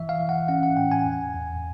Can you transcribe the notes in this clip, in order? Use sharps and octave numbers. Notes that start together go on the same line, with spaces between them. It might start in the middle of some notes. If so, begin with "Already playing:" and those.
Already playing: E3 E5
F5
E3
F#5
C#4 F#5
F#5
A2 G5
G#5
E2
E2